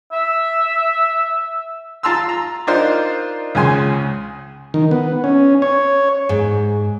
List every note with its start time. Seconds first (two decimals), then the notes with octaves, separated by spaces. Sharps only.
0.12 E5
2.03 F4 A5 A#5 C6 E6
2.29 A#5
2.67 D4 D#4 F4 A#4 C5
3.55 C#2 C#3 G#5 C6
4.74 D#3
4.91 B3
5.24 C#4
5.62 C#5
6.29 G#2